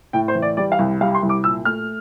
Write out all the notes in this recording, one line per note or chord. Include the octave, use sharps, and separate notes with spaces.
A2 G5
C5
E3
D5
G3 D5
F5
C2
G3 F5
C6
C2
D6
A#2 E6
A3 F6